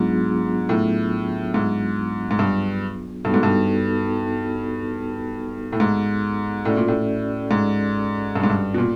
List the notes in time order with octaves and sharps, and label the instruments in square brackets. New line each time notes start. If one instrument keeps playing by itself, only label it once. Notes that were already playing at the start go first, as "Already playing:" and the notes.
Already playing: [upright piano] G#2 [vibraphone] F#3 B3 D4 F4 G#4
[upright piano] A2
G#2
G#2
G2
[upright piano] G2 [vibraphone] B3 D#4 F#4 A4
[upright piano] G#2
G2
A2
G#2
[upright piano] A2 [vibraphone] C#4 F#4 A4 D5
[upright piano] A#2
A2
G#2
G2
G#2
G2
B2
A#2